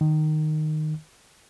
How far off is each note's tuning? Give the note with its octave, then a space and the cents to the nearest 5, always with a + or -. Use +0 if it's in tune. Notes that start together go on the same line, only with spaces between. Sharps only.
D#3 -10